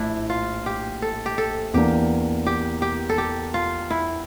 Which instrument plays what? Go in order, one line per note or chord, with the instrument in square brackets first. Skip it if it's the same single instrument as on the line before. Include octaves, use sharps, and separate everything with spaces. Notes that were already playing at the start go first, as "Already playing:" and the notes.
Already playing: [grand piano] A#1 A2 [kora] D4 E4
[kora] F4
G4
A4
G4
A4
[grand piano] E2 E3 A#3 D4 [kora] G4
[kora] G4
G4
A4
G4
F4
E4